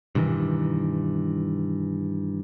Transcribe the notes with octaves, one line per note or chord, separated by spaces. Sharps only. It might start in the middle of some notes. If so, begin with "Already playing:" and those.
G2 B2 D#3 E3